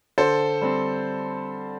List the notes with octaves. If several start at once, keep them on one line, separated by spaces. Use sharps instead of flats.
D3 A4 C5
G3 C4